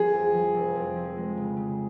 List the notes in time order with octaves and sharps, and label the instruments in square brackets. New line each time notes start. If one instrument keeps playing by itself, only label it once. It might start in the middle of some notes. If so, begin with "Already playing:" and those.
Already playing: [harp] F3 [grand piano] G#4
[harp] F2
F3
F1
F2
F3
G#3
C#3
C#3